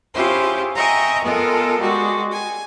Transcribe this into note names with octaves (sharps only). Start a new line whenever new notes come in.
C#4 E4 F4 G4 G#4 C5
D#5 E5 G5 G#5 A#5 C#6
G#3 B3 F4 A4 A#4
G3 G#3 F#4
G#5